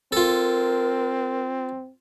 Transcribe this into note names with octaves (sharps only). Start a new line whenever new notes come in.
C4 F4 A4 A#4